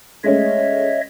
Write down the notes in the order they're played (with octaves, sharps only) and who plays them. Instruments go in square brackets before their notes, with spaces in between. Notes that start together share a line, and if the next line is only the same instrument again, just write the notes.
[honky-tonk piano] G#3 A3 C#4 [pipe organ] C#5 D#5 E5